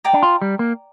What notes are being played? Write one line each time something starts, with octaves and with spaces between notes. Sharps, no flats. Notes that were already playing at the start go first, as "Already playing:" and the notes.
D5 G5 A#5 D6
D4
F4
G3
A#3